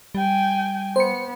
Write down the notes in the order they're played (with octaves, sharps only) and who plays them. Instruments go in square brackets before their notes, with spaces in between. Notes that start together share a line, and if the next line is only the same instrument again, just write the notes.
[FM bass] G3 [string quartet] G5 G#5
[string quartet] B3 [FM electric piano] C5 C#7